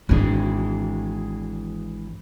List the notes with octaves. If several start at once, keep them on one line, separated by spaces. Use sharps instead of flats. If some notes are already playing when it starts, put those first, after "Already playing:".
G#1 E3 G#3 D4